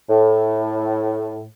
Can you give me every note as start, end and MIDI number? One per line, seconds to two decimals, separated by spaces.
0.08 1.45 45